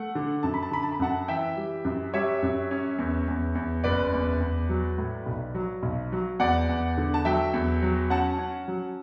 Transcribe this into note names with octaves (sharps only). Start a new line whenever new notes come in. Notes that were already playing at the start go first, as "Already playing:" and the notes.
Already playing: A3 F#5
D3
F#2 A5
B5
A5
D3 B5
A5
B5
F#2 F#5 A5
E3 E5 G5
G3
F#2
G3 C#5 E5
F#2
C#4
E2
E2
E2
F#1 B4 D5
E2
E2
F#3
A2
B1
F#3
B1
F#3
E2 D5 F#5
E2
D3
A5
F#3 E5 G5
E2
F#3
C#4 F#5 A5
C#4
F#3